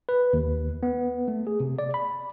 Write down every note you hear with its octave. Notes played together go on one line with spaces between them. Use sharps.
B4
D#2
B3
A3
G#4
C3
D5
B5